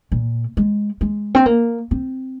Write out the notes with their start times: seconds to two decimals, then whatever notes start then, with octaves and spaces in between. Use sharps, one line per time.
0.12 A#2
0.57 G#3
1.01 G#3
1.35 C4
1.46 A#3
1.91 C4